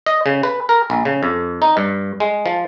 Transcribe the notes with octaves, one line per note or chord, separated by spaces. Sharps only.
D#5
C#3
B4
A#4
A#1
C#3
F2
D#4
G2
G#3
F3